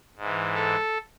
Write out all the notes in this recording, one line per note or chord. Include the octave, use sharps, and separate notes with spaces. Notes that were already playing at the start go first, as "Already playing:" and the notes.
G#2
E3
A4